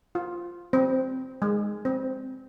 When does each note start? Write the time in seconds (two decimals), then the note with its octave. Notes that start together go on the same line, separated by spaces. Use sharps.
0.15 F4
0.73 C4
1.42 G#3
1.85 C4